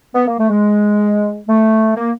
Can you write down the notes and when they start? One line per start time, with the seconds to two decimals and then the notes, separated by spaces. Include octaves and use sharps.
0.15 B3
0.27 A#3
0.39 A3
0.50 G#3
1.48 A3
1.96 A#3